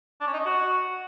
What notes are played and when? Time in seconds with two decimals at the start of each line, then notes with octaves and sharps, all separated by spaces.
0.21 D4
0.27 C#4
0.33 D#4
0.40 D#5
0.46 F#4